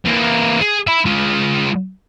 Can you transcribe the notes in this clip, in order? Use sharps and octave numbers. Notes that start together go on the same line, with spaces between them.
E3 A#3
G#4
E5 B5
G#3 F4